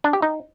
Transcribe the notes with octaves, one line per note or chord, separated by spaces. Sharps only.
D4
G4
D#4